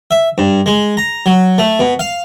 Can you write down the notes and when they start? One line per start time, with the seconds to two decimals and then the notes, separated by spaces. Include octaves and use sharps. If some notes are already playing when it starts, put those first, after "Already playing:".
0.11 E5
0.38 G2
0.66 G#3
0.97 A#5
1.26 F#3
1.58 A3
1.80 B2
1.99 F5